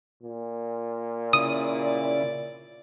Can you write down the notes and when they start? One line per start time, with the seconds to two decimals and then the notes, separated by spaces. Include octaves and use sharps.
0.23 A#2
1.33 C#3 E4 D5 D#6